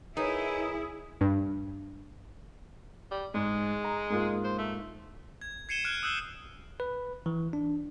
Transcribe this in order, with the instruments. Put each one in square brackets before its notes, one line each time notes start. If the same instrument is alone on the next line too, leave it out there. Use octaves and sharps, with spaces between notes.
[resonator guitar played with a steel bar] D#4 [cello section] E4 [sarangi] G#4 [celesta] A#4 B4 C#5
[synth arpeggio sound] G2
[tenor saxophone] G3
[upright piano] G#2 [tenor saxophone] G#3
[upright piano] A#5
G#2 A#3 F4
[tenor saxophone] C5
A3
[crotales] G#6
G#6 C7 C#7 D#7 E7 G7
F6 F#6 G#6 D7
D#6 E6 F#6 G6 C7 G7
[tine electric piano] B4
E3
D4